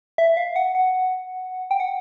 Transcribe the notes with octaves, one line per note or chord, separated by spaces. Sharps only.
E5
F5
F#5
F#5
G5
F#5